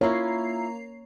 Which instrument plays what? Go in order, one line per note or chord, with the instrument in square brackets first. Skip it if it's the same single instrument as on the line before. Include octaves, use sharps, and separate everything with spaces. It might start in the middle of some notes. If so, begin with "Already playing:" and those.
[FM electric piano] A#3 A#5 C7 [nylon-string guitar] E4 F4 [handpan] C#5